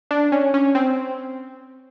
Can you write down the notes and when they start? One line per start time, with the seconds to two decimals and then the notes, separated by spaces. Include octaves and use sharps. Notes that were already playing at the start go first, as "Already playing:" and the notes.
0.11 D4
0.32 C#4
0.54 C#4
0.75 C4